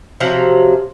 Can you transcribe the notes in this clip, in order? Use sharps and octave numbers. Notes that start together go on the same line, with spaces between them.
C3 F3 F#3